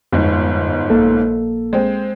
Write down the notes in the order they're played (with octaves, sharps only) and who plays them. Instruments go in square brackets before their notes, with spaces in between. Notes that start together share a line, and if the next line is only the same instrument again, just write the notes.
[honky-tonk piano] G1 G#2 [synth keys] F2
[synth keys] A#1 A#3 A4
[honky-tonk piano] G#3 C4